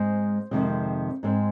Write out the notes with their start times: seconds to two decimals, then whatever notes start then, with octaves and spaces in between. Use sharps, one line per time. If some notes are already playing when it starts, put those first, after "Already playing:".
Already playing: G#2 G#3 C4 C5
0.51 F2 C3 D#3 G#3 C4
1.23 G#2 G#3 C4